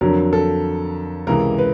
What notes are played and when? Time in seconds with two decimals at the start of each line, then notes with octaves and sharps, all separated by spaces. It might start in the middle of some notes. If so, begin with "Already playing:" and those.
0.01 F2 D3 F#3 A#4
0.33 A4
1.27 C#2 C3 E3 A#4
1.58 B4